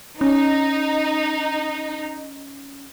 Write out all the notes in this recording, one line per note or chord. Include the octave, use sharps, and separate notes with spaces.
C#4 D#4